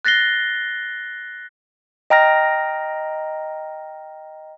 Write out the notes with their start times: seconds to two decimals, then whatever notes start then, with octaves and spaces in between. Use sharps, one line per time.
0.05 F#6 A6 A#6 C7 G7
2.10 D#5 G5 A#5 F6 A#6